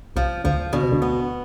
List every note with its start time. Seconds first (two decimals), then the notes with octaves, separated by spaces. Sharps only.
0.16 C2 C3 F3
0.44 D2 D3 F3
0.73 B2 D3
0.83 C3
0.92 D2 D3
1.02 B3